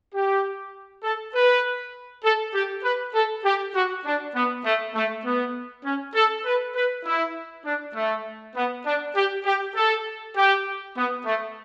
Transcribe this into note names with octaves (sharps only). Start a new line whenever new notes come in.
G4
A4
B4
A4
G4
B4
A4
G4
F#4
D4
B3
A3
A3
B3
C#4
A4
B4
B4
E4
D4
A3
B3
D4
G4
G4
A4
G4
B3
A3